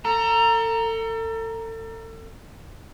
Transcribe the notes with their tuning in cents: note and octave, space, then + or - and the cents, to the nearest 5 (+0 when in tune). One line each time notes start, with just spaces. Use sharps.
A4 +35 A#5 +0